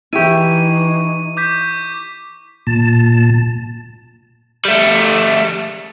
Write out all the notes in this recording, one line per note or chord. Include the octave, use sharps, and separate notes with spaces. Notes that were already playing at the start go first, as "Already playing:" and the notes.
E3 D#4 E4 G4 C#6 D#7
D6 G6 B6
A#2 A5
G3 A3